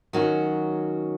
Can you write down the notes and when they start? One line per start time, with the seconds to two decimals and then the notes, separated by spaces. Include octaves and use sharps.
0.13 D#3 F#3 C#4 F#4